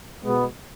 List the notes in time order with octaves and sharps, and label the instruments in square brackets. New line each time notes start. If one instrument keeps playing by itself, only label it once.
[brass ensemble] B2 G#3 B3